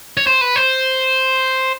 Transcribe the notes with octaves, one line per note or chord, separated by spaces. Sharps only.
C#5
C5
B4
C5